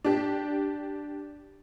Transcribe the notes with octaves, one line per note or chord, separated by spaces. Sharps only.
D4 G4